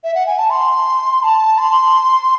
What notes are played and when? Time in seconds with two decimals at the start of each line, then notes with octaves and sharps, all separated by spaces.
0.04 E5
0.15 F#5
0.27 G#5
0.38 A5
0.50 C6
1.23 A5
1.58 C6